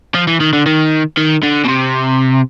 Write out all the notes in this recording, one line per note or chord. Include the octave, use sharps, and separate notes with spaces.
F3
E3
D#3
D3
D#3
D#3
D3
B2
C3